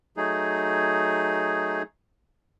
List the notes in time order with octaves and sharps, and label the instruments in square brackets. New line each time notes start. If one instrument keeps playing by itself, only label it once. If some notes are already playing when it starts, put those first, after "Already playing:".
[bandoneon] F#3 A3 D#4 G#4